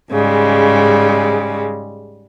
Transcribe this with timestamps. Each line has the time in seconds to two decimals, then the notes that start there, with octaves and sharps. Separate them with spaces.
0.11 G#2 C#3 G3 G#3